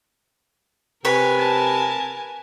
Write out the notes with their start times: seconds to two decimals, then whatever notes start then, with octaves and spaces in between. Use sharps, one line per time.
1.05 C3 A#4 B4 C#5 G#5 B5
1.39 A5